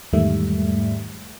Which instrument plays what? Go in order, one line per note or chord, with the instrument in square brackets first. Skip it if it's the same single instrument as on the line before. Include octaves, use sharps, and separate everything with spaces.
[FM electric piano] E2 G#2 D#3 G3 A3 E5